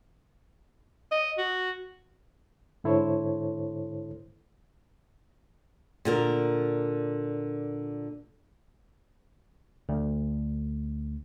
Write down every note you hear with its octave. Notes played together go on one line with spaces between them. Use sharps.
D#5
F#4
G#2 D3 E4 A4 C5 C#5
A#2 D3 A#4
D2